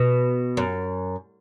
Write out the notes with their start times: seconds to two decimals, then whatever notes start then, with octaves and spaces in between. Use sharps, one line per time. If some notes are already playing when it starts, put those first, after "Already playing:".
Already playing: B2
0.57 F#2